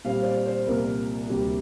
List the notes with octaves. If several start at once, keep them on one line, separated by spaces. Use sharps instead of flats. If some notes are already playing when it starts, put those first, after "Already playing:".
A#2 G3 C4 F5
C5
D5
C5
C2 A#2 F3 A#3 A#4
D2 C3 G3 A#3 G4